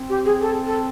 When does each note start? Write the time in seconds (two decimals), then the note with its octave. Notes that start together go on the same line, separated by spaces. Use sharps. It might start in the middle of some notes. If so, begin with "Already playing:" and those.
Already playing: C4
0.09 G4
0.25 G#4
0.41 A4
0.67 A4